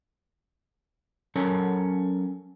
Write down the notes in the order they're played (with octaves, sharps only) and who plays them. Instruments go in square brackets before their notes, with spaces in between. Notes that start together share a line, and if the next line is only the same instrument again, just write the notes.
[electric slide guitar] F#3 C#4 A4 A#4 C#5